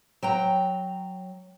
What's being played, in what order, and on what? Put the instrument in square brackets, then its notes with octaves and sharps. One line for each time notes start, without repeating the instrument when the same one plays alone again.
[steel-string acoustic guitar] F#3 G5 A#5